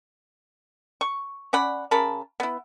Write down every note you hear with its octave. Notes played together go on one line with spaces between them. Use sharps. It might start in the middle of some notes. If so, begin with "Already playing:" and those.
C#6
C#4 D5 F#5 B5
C#3 A#4 A5 B5
B3 E4